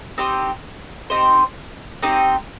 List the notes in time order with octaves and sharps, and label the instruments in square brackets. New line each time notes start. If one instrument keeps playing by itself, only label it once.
[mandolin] C4 D#4 G4 C5
C4 D#4 G4 C5
C4 D#4 G4 C5